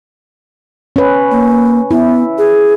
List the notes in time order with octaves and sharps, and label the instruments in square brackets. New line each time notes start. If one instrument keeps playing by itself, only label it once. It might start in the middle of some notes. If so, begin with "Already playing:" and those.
[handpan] C#4 B4
[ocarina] A#3
[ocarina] B3 [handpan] E4
[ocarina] G#4